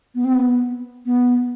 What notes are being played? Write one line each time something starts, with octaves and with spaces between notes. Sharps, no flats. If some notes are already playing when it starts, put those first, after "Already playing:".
B3
C4
B3
B3